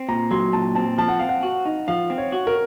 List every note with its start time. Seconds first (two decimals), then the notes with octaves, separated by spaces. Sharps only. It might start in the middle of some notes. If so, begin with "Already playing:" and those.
Already playing: C4
0.09 A#2 A#5
0.31 F#3 C6
0.53 A#2 A5
0.75 C4 A5
0.98 F3 A5
1.08 F#5
1.19 C4 F5
1.29 F#5
1.43 F#4
1.65 D#4
1.88 F3 F5
2.10 C4
2.18 C#5
2.32 F#4
2.47 A#4